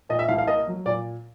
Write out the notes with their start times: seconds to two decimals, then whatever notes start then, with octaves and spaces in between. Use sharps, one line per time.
0.09 A#2 D#5
0.19 E5
0.28 C2 F5
0.38 F5
0.47 A#3 D#5
0.67 F#3
0.86 A#2 D5